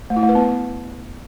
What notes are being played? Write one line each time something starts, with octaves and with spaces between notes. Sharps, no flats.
A3
E4
A3
B4
B3